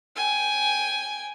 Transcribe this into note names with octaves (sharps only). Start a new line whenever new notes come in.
G5 G#5